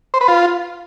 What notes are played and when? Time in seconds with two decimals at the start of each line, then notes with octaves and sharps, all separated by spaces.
0.14 C5
0.21 B4
0.28 F4